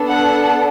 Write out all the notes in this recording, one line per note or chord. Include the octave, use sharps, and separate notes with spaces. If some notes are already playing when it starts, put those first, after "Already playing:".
Already playing: B3 D4 A4
F#5